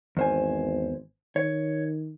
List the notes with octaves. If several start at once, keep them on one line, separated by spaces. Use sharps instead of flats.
G#1 E2 C5 G#5
D#3 C#5